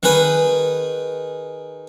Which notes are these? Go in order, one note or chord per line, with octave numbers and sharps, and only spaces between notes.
D#3 G#4 B4